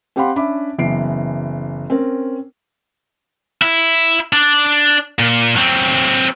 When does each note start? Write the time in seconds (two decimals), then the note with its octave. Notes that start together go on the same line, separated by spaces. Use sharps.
0.16 C4 G4 F5 F#5 B5 C6
0.36 C#4 D4 E5 B5 D6
0.79 F#1 E3 B3 C7 D7
1.90 C4 C#4 A#4
3.62 E4
4.33 D4 D5
5.19 A#2
5.56 F#3 C4